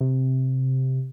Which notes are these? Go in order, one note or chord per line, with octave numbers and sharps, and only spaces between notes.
C3